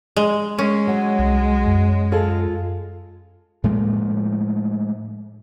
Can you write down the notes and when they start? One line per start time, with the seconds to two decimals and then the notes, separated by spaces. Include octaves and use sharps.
0.16 G#3
0.58 G#3 C#4
0.87 F#3
1.19 C2
1.66 F#2
2.12 F4 G#4 A4
3.64 A2 F3 G#3 A#3